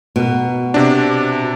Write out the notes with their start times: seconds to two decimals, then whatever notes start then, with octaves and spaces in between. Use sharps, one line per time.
0.16 B2 A#4
0.74 C3 D4